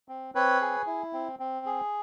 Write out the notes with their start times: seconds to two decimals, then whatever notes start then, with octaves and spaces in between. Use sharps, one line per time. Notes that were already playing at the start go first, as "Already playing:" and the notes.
0.08 C4
0.35 C4 B4 C#5
0.61 G#4
0.87 E4
1.13 C4
1.39 C4
1.66 G#4